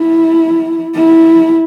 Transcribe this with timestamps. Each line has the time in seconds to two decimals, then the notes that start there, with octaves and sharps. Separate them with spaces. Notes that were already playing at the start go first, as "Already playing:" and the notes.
Already playing: E4
0.95 E4